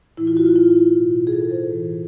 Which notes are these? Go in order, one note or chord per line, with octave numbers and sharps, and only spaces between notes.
A2 E3 E4
F4
F#4
F4
E4
B2
G#4
A4
C5
A2 E3